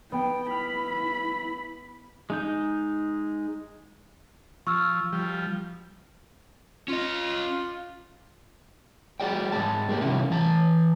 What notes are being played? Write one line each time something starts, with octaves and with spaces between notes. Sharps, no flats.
B3 G5
E4 B5 F6
G#3 D#4 G6
F3 C#6 E6 F6
F3 G3
C#4 F4 D#5
F#4 G#4 D5 G5
G#2 F#3 G#3 A5
G#3 A#3 G4
C3 D#3 F3 C#4 E4 F4
E3 A5 A#5